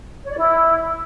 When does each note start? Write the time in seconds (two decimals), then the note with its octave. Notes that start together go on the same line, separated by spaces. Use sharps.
0.24 C#5
0.30 D5
0.37 E4